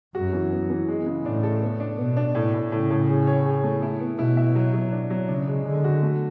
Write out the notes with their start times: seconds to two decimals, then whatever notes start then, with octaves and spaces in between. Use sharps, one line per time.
0.15 F#2 F#4
0.33 E3
0.52 B3
0.70 E3
0.88 G#3
1.06 C#3
1.25 A2 D4
1.43 A4
1.62 B3
1.80 D4
1.98 B2 B3
2.17 D4
2.35 A2
2.54 A2
2.72 A2 C#3
2.90 A2
3.09 G#4
3.27 C#5
3.46 G#4
3.64 A3
3.82 E4
4.00 B3
4.19 B2 E4
4.37 E5
4.55 F#3
4.73 F#3
4.92 D4
5.10 F#3
5.28 C#3 D4
5.48 G#3
5.65 D3 G#3
5.84 F#4
6.03 A3